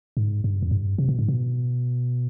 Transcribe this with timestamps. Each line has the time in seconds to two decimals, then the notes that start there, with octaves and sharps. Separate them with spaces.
0.17 G#2
0.44 G2
0.63 F2
0.71 G2
0.98 C3
1.09 B2
1.19 G#2
1.28 B2